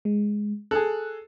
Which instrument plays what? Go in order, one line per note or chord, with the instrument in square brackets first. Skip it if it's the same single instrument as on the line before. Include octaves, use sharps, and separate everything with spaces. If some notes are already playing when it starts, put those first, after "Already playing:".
[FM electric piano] G#3
[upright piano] G#4 A4 [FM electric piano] F#6